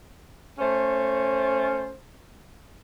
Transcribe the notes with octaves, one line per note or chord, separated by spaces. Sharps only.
A3 C#4 C5